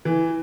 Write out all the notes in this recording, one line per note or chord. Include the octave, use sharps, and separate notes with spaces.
E3